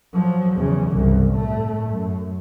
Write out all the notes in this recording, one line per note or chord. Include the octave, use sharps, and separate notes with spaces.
F3 F#3
E2 C#3
G1 C2
A2 A3
F#2